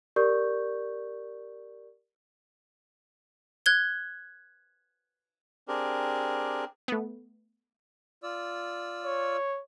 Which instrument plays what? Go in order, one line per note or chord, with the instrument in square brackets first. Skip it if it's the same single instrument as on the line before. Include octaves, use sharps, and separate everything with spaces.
[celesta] G4 A#4 D5 C#6 G6
[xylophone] F#6 G#6 G7
[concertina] C4 D4 G4 G#4 A#4
[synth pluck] A3 B3
[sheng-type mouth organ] F4 D5 E6
[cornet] C#5